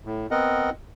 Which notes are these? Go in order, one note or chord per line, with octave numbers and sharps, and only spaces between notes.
A2
B3 C4 A#4 D#5 F#5